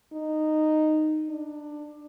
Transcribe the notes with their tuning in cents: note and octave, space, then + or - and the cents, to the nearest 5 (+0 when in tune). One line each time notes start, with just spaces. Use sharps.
D#4 -10
D4 +15